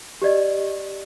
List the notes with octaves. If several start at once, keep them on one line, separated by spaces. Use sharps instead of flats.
G4 B4 D5 D#5